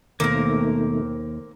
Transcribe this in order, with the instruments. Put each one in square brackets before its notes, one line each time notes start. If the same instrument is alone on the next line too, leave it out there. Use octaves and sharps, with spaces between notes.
[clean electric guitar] D#2 [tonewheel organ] B2 D#3 A3 [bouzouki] A#3 C4 A#4